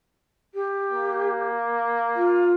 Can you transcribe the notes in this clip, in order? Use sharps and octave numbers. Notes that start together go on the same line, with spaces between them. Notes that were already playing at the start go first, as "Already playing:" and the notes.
G4
A#3
F4